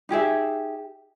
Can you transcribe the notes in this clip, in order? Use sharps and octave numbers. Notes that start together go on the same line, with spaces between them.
D#4 G4 G#4 E5